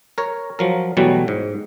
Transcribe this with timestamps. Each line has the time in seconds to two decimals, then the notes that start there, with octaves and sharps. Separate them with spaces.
0.18 A#4 C#5
0.59 F3 F#3 A#4
0.97 B2 E3 F#3 G3 A3
1.28 G#2